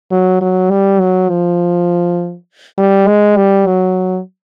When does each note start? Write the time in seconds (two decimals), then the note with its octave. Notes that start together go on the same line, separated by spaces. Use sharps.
0.11 F#3
0.41 F#3
0.71 G3
1.00 F#3
1.29 F3
2.78 G3
3.07 G#3
3.37 G3
3.66 F#3